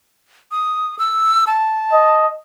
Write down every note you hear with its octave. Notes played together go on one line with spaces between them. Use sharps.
D#6
E6
A5
D#5